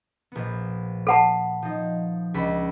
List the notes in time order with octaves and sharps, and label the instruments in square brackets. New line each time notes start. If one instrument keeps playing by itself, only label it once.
[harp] A#1 B3
[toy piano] A4 F#5 A5 [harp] B5
[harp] F3 D#4
C#2 D4 B5